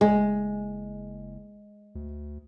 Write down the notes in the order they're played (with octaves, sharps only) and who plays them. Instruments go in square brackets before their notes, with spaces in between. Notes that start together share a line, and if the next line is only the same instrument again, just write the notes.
[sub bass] F#1 [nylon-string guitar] G#3
[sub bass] D2